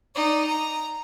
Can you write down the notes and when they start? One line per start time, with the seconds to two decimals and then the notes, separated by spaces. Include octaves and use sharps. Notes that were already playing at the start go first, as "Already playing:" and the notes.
0.15 D#4 D5
0.47 A#5